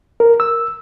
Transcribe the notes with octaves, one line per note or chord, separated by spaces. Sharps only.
A#4
E6